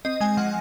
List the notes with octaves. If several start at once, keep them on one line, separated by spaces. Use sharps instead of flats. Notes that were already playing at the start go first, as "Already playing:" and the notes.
C4 D#5
G#3 G#5
F3 F#5